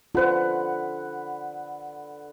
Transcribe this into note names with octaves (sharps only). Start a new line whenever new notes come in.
D3 F4 B4 C5 F#5